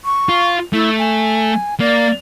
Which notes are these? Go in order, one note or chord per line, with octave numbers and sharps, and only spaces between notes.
C#6
F4
A3 E4
G#5
A#3 D5